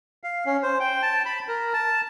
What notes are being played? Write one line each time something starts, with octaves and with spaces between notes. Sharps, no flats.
F5
C#4
C5
G5
A5
B5
A#4
A5